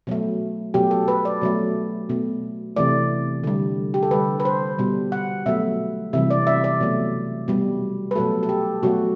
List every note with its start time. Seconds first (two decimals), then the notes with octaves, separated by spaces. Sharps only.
0.07 B2 F#3 A3
0.74 B2 F#3 A3 G4
0.91 A4
1.08 B4
1.25 D5
1.41 B2 F#3 A3
2.09 B2 A3
2.76 C3 E3 A3 D5
3.44 D3 G3
3.94 G4
4.03 A4
4.11 D3 G3 B4
4.40 B4
4.45 C5
4.79 B2 G3
5.12 F#5
5.46 B2 F#3 A3 E5
6.13 C3 E3 G3 E5
6.30 D5
6.47 E5
6.64 D5
6.81 B2 F#3 A3
7.48 B2 G3
8.11 B4
8.15 B2 F#3 A3 A4
8.43 A4
8.49 G4
8.83 B2 F#3 A3 F#4